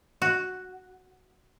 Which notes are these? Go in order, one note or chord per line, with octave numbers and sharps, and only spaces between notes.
F#4